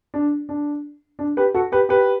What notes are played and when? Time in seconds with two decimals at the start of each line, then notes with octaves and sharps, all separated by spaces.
0.14 D4
0.49 D4
1.19 D4
1.37 G4 B4
1.54 F#4 A4
1.72 G4 B4
1.89 G4 B4